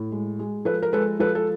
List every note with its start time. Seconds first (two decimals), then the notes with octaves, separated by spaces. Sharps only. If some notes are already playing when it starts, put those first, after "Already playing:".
Already playing: A2
0.12 G#3
0.39 G#3
0.65 F3 A4 B4
0.83 A#4
0.93 G#3 A4 B4
1.20 F3 A4 B4
1.35 A4